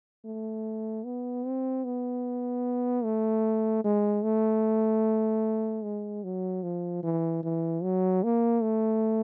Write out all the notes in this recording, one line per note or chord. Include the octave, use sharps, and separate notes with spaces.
A3
B3
C4
B3
A3
G#3
A3
G#3
F#3
F3
E3
E3
F#3
A#3
A3